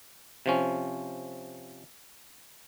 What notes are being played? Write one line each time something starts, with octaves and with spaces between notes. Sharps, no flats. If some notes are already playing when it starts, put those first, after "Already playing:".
C3 F3 C#4